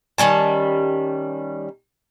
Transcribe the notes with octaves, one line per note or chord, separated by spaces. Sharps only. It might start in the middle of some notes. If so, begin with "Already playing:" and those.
D#3 G3 C#4 A5